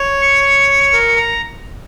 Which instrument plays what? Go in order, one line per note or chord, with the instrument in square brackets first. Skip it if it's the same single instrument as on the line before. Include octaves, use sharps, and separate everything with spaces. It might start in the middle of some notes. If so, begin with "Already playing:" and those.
Already playing: [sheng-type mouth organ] C#5
[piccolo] C#7
[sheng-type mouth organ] A#4
A#5